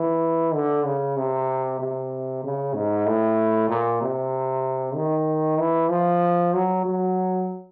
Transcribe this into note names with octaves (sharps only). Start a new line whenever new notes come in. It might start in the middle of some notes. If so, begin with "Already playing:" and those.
Already playing: E3
D3
C#3
C3
C3
C#3
G#2
A2
A#2
C3
D#3
E3
F3
F#3
F#3